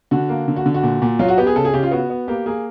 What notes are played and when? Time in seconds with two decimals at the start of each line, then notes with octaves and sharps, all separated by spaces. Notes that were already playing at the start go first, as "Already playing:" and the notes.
0.11 D3 F#4
0.29 A#3
0.48 D3
0.56 F#4
0.66 D3
0.74 F#4
0.83 A#2
1.02 A#2
1.19 F#3 F4
1.28 F#4
1.38 B3 G4
1.47 G#4
1.56 C#3 A4
1.65 G#4
1.74 C#3 G4
1.83 F4
1.91 B3 F#4
2.10 B3
2.28 A#3 G4
2.46 A#3 G#4